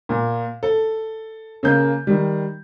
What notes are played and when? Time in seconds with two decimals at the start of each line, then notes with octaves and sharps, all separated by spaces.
0.09 A#2
0.63 A4
1.63 C#3 A#3 G6
2.07 D#3 G3